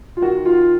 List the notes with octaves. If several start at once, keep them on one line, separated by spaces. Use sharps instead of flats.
F4
D#3 F#4
F4